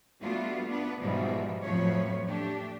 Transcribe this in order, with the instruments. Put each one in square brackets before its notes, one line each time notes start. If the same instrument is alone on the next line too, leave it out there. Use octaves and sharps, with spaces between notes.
[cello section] G3 A3 B3 D4 F4 F#4
B3 D4 B4
G#2 B2 E3 F3 G3 G#3
F2 A2 F3 F#3 B4 C#5
A3 D4 G4